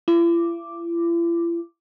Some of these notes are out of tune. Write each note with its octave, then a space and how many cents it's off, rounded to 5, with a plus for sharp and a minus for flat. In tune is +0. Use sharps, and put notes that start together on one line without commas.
E4 +45 D6 +0